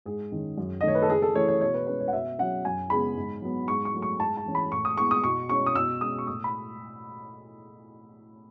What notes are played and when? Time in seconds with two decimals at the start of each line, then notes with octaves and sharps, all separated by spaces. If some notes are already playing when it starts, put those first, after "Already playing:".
0.06 G#2 G#4
0.32 D#3 G#3 C#4
0.58 F#2
0.81 D#5
0.83 D#3 A3 C#5
0.95 B4
1.02 A4
1.10 C#3 G#4
1.22 A4
1.35 E3 A3 C#4 C#5
1.48 C#5
1.61 B2 C#5
1.74 B4
1.87 G#3 C#4 B4
2.00 C#5
2.08 F#5
2.13 B2 E5
2.39 F#3 C#4 F#5
2.65 F#2 G#5
2.90 C#3 G#3 B3 B5
3.16 G#2
3.42 F#3 B3
3.68 G#2 C#6
3.85 C#6
3.94 F#3 A3
4.02 C#6
4.20 G#2 A5
4.37 A5
4.46 E3 A3 C#4
4.55 B5
4.72 A2 C#6
4.85 D#6
4.97 G#3 B3 C#6
5.11 D#6
5.24 B2 C#6
5.49 G#3 C#4 C#6
5.66 D#6
5.75 B2 E6
6.01 G#3 C#4 D#6
6.18 C#6
6.27 A2 D#6
6.44 B5